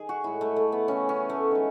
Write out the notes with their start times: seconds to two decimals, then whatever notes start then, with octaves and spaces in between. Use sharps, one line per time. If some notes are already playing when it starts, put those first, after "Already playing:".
Already playing: D#3 G#4
0.09 F#4
0.24 A2 G#3 E4
0.41 A3
0.56 A3
0.72 B3
0.88 C#3 E3 A3 C#4
1.09 C#4
1.30 A3
1.51 D#3 G#3